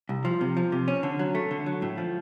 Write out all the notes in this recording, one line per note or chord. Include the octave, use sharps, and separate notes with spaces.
C2
F3
C3
F3
C3
C#4
D3
F#3
A3
D3
F#3
A2
F3